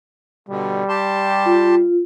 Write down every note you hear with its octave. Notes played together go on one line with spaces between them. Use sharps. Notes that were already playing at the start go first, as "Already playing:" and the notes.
B2 D3 G3
G4 A5 C6
F4